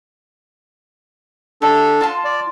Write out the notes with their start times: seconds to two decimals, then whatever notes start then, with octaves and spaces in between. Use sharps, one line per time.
1.62 D4 G4 A4 E5
2.01 F4 A5 C6
2.25 D5